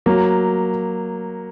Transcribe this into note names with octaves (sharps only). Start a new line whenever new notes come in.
F#3 A#3